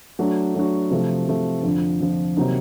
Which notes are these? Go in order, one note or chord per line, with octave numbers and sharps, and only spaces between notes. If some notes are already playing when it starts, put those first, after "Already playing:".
F#3 A3 D4 F#4
F#3 A3 D4 F#4
C3 F3 A3
C3 F3 A3
F2 D3 F3
F2 D3 F3
C3 D#3 F#3 A#3 D#4